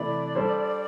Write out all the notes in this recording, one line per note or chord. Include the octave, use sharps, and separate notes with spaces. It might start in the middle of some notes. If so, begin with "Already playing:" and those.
Already playing: C3 E3 A3 E4 B4 D5
G3 D4 A4 C5